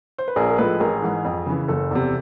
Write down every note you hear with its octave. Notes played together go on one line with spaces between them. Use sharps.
C5
B4
A#1 G#4 A#4
A#4
A2 F3 G#3 A4 B4
A1 G#4 A#4
G#2 E3
F2
C#3 E3
F#1 A4
E2 C3